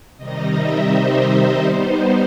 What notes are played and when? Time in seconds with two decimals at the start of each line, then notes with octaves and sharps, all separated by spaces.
0.17 C3 D#3 G3 D#4 D#5
0.53 E5
0.90 C5
1.27 C5
1.63 G3 B3 D#4 C5